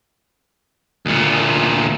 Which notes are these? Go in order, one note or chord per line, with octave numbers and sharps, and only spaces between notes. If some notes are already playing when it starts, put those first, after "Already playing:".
D2 A#2